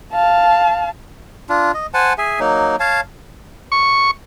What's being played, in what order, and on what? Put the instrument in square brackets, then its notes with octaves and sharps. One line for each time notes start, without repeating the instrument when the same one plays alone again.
[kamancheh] F5 A5
[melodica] D4 F4
D#5
C5 F#5 G#5 A5
G#4 E5 G#5
F#3 A#3 D#4
C#5 F5 A5
[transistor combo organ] C#6